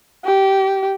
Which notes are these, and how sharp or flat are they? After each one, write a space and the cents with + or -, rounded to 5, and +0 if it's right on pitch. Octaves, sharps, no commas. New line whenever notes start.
G4 -15